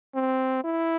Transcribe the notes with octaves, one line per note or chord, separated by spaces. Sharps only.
C4
E4